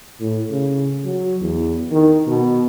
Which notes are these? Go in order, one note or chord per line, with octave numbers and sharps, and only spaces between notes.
A2
C#3
F#3
E2
D#3
B2